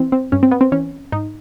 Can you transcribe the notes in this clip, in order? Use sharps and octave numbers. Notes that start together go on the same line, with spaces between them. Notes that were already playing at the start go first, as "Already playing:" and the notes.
Already playing: E3 C4
C4
G2 C#4
C4
B3
C4
E3 C#4
G#2 D#4